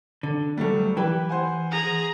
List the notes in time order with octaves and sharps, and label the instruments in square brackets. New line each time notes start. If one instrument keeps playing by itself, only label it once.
[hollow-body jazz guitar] D3
[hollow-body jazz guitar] D2 F#3 [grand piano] G3 A3
[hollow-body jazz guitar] E3 [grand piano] G4 B4 G5
[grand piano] C5 F#5 G#5
[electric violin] G#4 A#5